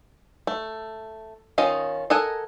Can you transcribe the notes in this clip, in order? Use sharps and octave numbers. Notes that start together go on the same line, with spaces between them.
A3
D#3 C#4 F4 D#5
A4 A#4 D#5 F#5 G#5